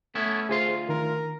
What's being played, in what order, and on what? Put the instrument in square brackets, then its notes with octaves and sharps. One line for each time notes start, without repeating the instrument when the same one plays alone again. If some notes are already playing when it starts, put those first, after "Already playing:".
[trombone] A3 [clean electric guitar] B3 C#4 E4
[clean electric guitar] D2 F4 C6 [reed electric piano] G#4 C5
[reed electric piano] D#3 [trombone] A#4